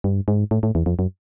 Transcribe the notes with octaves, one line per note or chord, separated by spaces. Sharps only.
G2
G#2
A2
A2
E2
F2
F#2